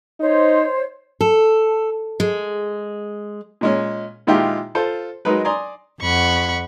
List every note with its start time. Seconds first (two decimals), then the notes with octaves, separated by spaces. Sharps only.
0.20 D#4 C5 C#5
1.21 A4
2.20 G#3
3.61 A#2 G#3 C#4
4.27 A#2 D#3 G#3 E4 F4 G4
4.75 F4 A4 C5
5.25 F#3 G#3 D#4 A#4 B4
5.45 D5 G#5 A#5 C6 D#6
6.02 F2 F#5 B5 C#6